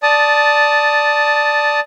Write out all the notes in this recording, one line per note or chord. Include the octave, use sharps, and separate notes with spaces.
D5 A5 D#6